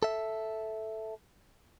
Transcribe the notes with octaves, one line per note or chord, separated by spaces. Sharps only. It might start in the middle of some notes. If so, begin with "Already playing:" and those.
A4 E5